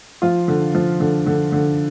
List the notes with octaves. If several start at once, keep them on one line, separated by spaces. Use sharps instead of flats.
F3 F4
D3
F3
D3
D3
D3